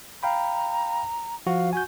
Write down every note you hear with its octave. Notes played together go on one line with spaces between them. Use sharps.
F5 G5 A#5 B5
F3 F#4 F5
F#4 G#5 G6